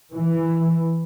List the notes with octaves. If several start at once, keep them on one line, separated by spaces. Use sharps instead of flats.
E3